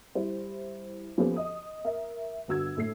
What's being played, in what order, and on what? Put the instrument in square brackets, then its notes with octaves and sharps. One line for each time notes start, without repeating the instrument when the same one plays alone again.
[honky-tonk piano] G3 E4 C5
F3 A#3 B3 C#4 G4 A4
D#5 D#6
A#4 E5
G1 F#4 E6 G#6
A2 A3 C7